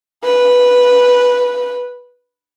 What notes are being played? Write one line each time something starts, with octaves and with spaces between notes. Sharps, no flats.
B4